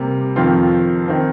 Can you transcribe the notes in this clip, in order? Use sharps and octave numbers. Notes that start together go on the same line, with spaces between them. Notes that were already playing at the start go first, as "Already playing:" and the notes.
Already playing: C3 G3 A#3
F2 D#3 C4 F4
D#3 C4